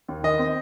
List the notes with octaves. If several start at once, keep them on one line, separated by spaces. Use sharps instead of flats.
D#2
D#3 D#5
C4